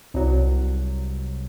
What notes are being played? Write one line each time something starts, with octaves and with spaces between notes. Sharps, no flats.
C2 F#3